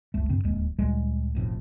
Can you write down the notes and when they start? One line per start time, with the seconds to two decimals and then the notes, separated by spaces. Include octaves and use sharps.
0.14 F#1 C#2 A3
0.29 G2 C#3 C4
0.45 D1 D#2 G#3
0.78 D2 A#2 G3 G#3
1.35 F1 B1 F2 A2